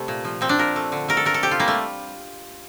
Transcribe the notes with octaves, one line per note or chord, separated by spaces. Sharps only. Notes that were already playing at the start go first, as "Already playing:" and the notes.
Already playing: C3 G3 A3
A#2
F3
A#2 C4
D4
A#2 A#4
A3
D3
A3 A#4
A4
A3 A#4
A4
C3 G4
F4
G3 A#3
A3